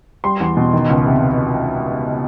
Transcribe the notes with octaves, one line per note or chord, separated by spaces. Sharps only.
G3 C6
E2
B2
D#3
C#2
C3